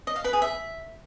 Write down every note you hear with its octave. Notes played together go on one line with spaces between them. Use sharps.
D#5
F5
B4
G#4
E5